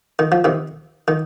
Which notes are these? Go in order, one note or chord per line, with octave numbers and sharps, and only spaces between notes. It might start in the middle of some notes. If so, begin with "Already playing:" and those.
D#3
F3
C3 D#3
D#3